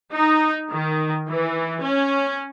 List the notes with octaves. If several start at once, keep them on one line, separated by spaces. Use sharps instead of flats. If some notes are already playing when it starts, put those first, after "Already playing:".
D#4
D#3
E3
C#4